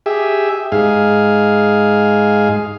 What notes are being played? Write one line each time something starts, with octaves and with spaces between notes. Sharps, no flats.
G4 G#4 E5
G#2 G#4 F5